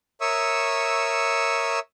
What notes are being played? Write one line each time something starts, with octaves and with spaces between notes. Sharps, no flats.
A#4 C#5 E5 C#6 D#6 E6